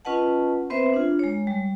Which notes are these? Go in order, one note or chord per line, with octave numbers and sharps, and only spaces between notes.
C#4 F4 B4 D#5 F#5 A5
B3 C4 B4 C5 E5
D4 F4
G#3 C#5
G3